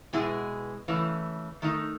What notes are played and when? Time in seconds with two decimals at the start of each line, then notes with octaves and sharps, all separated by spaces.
0.13 B2 G#3 B3 E4 G#4
0.88 C#3 E3 A3
1.62 D#3 A3 D#4